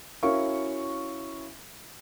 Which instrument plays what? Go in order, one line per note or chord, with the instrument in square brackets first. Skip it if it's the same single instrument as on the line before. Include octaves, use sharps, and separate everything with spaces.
[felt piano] C#4 E4 F#4 A#4 F5 C#6